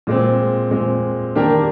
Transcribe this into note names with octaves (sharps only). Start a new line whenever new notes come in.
A#2 G#3 C4
A#2 G#3 C4
D#3 A#3 D4 G4 A#4